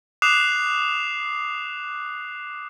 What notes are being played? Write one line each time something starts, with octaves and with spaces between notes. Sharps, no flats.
D6 D#6 F#6 C7 E7 F7